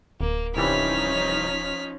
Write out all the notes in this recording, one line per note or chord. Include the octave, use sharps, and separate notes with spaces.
D1 A#3
C2 E3 F3 G3 C#4 D#4 F6 B6